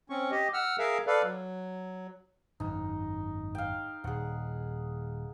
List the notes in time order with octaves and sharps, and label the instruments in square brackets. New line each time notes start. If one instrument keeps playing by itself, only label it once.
[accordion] C4 C#4 C#6
G4 D#5
F#5 E6 F6
G#4 A#4 E5 F5
A4 B4 D5 F5
F#3
[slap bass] G#1 F#2 [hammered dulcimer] D#4
[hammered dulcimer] F5 G5
[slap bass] D#1 [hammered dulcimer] G#4 F#5